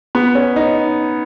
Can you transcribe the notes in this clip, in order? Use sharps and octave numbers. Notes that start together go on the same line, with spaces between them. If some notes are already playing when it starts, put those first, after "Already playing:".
B3
C#4
D#4